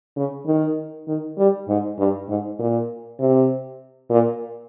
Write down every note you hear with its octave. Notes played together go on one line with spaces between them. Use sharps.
C#3
D#3
D#3
G3
G#2
G2
G#2
A#2
C3
A#2